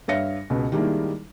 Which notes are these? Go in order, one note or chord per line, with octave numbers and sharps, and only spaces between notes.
G2 C#5 E5 F5 A#6 C#7
C#2 B2
D#3 G3 G#3 A#3 D4 E4